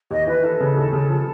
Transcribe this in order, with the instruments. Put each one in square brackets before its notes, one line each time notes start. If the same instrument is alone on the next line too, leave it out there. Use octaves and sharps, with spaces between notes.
[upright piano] D#2 [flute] D#5
[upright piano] E3 [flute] B4
[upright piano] E3 [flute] A4
[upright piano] C#3
D#2
C#3
F3